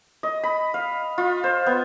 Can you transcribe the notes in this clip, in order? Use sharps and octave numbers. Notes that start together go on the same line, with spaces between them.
D#5
B5
F5
F4
C5
B3